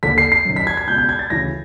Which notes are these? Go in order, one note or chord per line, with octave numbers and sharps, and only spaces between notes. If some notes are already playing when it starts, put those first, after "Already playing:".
D#2 D3 B6
C7
C7
F#2 D#3
B6
G#6
G#6
C#2 B2 G6
G6
G#6
A6
D2 C#3 E3 A#6